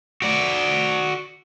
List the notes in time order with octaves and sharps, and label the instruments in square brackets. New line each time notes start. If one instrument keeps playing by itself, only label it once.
[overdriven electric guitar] F#4 D5